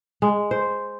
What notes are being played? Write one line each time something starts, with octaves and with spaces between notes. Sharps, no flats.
G#3
C5